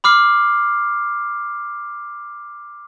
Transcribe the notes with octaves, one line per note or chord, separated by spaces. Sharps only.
B5 D6 F6 C7